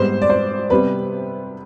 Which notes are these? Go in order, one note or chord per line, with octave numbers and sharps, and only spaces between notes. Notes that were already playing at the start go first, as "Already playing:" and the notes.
Already playing: G#2 G3 B3 C5
D5
C5
C3 G3 B3 B4